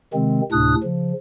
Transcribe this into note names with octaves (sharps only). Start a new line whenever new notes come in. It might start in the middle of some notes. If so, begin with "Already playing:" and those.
C3 D#3 G#3 C4
D2 A2 C3 D4 D#6 F#6
C#3 F3